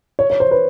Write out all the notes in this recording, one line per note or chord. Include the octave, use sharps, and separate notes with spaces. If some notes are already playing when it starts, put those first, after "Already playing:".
C#5
C#5
C5
B4